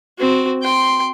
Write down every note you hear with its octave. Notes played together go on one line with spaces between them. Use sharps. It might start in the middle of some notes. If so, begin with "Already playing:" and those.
C4 F#4
G5 C6